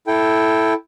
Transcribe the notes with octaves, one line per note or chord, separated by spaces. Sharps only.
E4 A4 G5